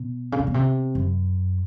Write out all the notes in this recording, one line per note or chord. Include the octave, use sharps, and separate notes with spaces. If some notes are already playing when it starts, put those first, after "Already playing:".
Already playing: B2
C#3
C3
B2
C3
F#2